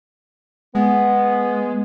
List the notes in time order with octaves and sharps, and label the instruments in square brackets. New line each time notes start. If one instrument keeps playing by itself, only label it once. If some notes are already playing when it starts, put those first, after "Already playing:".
[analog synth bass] G#3 [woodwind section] B3